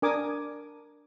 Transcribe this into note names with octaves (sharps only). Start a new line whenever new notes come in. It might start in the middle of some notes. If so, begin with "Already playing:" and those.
D4 A#4 G#5 D6 D#6